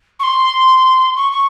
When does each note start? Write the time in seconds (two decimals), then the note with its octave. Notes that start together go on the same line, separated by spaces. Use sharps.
0.20 C#6
0.23 C6
1.16 C#6
1.32 C#6